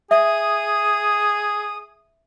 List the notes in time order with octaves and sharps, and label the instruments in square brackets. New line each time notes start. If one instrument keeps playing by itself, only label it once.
[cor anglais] G#4 [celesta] E5 [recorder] D#6